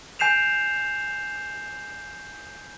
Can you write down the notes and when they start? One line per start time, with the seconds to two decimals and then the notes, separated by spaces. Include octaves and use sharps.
0.19 G#5 G6 C7 E7 F7